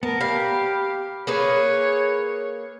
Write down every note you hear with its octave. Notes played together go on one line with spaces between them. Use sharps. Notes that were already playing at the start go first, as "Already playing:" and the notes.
B3 A#4 A5
G4 F5 B5
A#3 G#4 B4 C#5